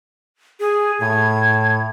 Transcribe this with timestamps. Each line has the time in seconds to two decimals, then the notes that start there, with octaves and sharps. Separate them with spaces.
0.60 G#4
1.01 A2 G#6